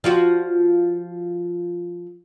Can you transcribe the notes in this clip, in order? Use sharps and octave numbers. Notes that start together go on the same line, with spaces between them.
F3 F4 F#4